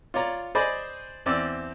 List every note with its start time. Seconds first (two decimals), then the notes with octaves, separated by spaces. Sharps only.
0.14 F4 C#5 D5 A#5
0.55 G#4 C5 D5 D#5 G#5 B5
1.26 E2 C4 D5 E6